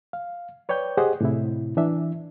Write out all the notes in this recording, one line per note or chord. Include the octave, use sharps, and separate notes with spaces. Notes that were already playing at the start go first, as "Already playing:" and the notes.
F5
B4 C#5 D5 G5 G6
G4 G#4 C5 D#5 F#5
A2 C3 E4
E3 D4 E5